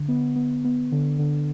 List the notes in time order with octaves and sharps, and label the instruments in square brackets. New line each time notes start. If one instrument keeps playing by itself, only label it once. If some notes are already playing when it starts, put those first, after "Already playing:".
Already playing: [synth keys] D3
B3
B3
B3
D3
D3